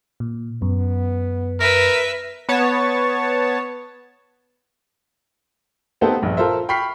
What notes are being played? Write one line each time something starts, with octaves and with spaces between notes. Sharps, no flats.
A#2
F#2 B3
A#4 B4 E5
B3 C#5 A5
B3 C4 D#4 G4 A4 C5
A#1 G2
F4 A4 A#4 C5 E5
G5 B5 C#6 F6 B6 C7